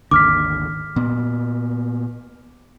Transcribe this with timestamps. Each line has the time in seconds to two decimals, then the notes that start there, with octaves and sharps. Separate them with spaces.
0.11 G#1 D#2 D3 D6 F6 B6
0.96 A#2 B3